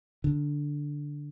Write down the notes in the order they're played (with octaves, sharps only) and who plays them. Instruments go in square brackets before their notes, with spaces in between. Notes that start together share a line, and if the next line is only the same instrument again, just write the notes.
[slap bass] D3